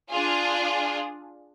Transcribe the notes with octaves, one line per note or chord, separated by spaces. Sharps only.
D4 F4 G#4